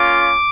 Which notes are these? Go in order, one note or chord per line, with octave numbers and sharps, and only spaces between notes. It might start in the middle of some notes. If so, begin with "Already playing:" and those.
Already playing: A#3 C#4 F4 D6